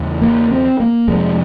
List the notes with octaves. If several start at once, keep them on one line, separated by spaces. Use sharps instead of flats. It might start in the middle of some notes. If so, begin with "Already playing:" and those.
Already playing: E2 C#3
A#3
C4
A#3
F2 C3 G#3